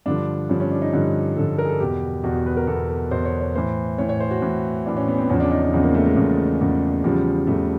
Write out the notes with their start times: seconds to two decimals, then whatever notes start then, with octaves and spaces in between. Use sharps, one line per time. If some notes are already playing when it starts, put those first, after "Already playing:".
0.06 G2 D3 F3 D4
0.49 G2 D3 F3 C#4
0.60 C#4
0.71 D4
0.82 D#4
0.93 G2 D3 F3
1.36 G2 D3 F3 A4
1.58 A#4
1.65 G#4
1.69 A4
1.80 E2 B2 G4
2.24 E2 B2 F#4
2.35 F#4
2.46 B4
2.57 A#4
2.67 E2 B2 A4
2.89 A4
3.11 E2 B2 C5
3.25 C#5
3.40 C#5
3.55 A2 E3 C5
3.98 A2 E3 C#5
4.09 C#5
4.20 C5
4.31 F#4
4.42 A2 E3
4.86 A2 E3 D4
4.97 C#4
5.08 B3
5.18 C4
5.29 E2 C#3 F3 C#4
5.40 D4
5.51 D#4
5.62 D4
5.73 E2 C#3 F3
5.83 A#3
5.95 A3
6.06 G#3
6.16 E2 C#3 F3
6.61 E2 C#3 F3
7.04 E2 C#3 F3 G3
7.47 E2 C#3 F3 A3